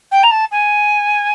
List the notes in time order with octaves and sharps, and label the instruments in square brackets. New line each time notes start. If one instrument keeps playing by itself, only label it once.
[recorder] G5
A#5
A5
G#5